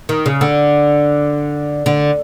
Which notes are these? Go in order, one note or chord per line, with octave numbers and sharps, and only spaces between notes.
D#3
C#3
D3
D3